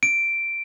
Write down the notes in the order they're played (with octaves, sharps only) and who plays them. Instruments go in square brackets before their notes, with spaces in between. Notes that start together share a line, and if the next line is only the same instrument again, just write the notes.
[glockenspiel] D7